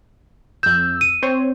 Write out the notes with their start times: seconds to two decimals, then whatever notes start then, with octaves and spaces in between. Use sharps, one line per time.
0.63 F2 E6 G6
1.01 D#7
1.23 C4 C5 C#5